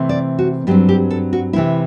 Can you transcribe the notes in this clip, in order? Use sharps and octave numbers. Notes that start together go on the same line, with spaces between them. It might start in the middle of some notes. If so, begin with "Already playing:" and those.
Already playing: C3 E3 A3 C4
D5
F#4
G2 F#3 C4 G4
G4
A4
F#4
C3 E3 A3 C4 E4